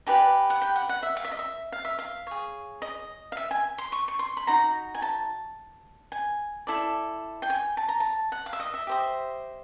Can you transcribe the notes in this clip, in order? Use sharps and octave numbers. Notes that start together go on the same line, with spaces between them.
D#4 G4 B4 D5 G#5
F#5
G5
F#5
F#5
E5
F5
E5
D#5
E5
F5
E5
F5
G#4 C#5
D#5
F5
E5
G#5
C6
C#6
C#6
C6
B5
D#4 F#4 A#5
G#5
A5
G#5
E4 A4 D5
G5
G#5
A5
A#5
A5
F#5
F5
E5
D#5
E5
G4 C5 D#5